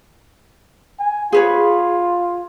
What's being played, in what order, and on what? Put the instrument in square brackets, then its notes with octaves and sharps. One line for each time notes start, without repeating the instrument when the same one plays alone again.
[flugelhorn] G#5
[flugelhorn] F4 [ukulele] G#4 B4 C#5